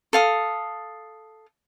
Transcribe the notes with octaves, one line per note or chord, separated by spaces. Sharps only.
A4 F5 D#6